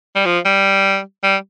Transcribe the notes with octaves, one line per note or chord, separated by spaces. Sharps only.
G3
F3
G3
G3